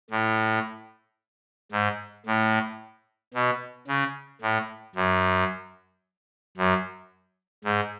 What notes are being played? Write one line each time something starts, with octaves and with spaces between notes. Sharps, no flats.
A2
G#2
A2
B2
C#3
A2
F#2
F#2
G#2